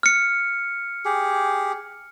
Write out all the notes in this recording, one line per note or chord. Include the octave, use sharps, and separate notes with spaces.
F6 C#7
G4 G#4